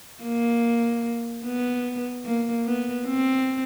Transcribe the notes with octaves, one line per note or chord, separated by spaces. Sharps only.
A#3
B3
A#3
B3
C4